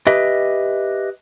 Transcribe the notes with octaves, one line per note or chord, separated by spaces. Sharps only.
G4 B4 D#5 E5